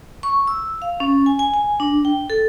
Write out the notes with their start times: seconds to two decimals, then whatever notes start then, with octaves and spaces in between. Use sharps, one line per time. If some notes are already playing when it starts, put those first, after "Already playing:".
0.23 C#6
0.47 E6
0.82 F5
1.00 C#4
1.26 G#5
1.39 G#5
1.54 G#5
1.80 D4
2.05 G5
2.30 A4